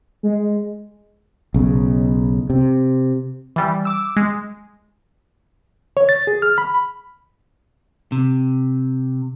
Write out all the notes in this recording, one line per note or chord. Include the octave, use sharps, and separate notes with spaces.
G#3
B1 C#3
C3
E3 G3
D6 E6
G#3
C#5
A6
G#4
F6
B5
C3